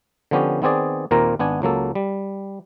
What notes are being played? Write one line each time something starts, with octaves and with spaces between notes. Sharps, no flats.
D3 F3 B3 C#4 G4
D#3 B3 C4 G#4 D5
D#2 A#2 A#3 C4 A#4 A#5
G#1 B3 D4 G#5
C#2 F#3 A#3 A4
G3